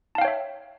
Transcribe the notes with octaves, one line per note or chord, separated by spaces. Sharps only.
C#5 E5 F5 G5 A5